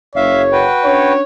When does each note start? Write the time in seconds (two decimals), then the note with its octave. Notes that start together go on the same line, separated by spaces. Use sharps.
0.16 F#1 C#5 E5 F5
0.52 F#4 B4 G5
0.84 C#4 D4 C#5